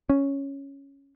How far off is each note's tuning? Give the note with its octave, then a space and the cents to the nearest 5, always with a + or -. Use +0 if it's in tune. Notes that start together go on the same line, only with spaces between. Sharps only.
C#4 +0